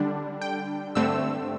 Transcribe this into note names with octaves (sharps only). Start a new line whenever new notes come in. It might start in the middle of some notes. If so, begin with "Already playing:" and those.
Already playing: D3 G3 D4
G5
G2 D3 A3 C4 E6